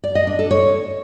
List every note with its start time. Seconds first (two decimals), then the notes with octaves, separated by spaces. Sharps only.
0.04 D5
0.15 D#5
0.27 D4
0.39 A4
0.51 C#5